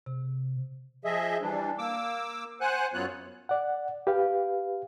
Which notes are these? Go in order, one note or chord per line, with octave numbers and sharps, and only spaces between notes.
C3
F3 G#4 D#5 E5
E3 G3 D4
A#3 D6 E6
C5 F#5 G#5 F#6
F#2 F#3 B3 F4 C#5 F#6
D5 F#5
G4 B4 F5